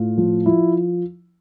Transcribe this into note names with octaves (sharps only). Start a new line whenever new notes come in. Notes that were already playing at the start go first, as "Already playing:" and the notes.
Already playing: A2 F4
F3
F3 E4